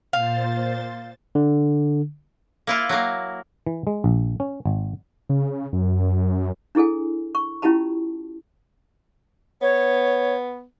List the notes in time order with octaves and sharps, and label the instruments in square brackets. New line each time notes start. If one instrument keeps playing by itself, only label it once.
[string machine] A#2 C5 A6 [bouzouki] F5
[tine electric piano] D3
[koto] A#3 E4 F4
F#3 A#3
[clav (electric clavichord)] E3
G#3
A#1
C#4
G#1
[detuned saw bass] C#3
F#2
[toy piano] D4 E4 G#4 A4 G#5
C#6
C#4 E4 F4 G4 A5 B5
[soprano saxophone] B3 [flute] C#5